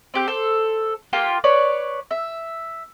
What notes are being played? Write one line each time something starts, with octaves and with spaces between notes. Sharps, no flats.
C4 G4 G6
A4 C5
A#3 F4 G4 G5
B4 C#5 D5
E5